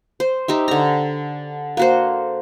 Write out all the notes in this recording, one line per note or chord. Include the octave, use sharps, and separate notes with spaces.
C5
D#4 G4 E5
D3 A#5
A#3 F#4 C5